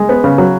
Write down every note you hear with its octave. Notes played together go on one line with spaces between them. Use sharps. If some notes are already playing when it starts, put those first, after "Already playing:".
Already playing: G#3
B3
C#3
F#3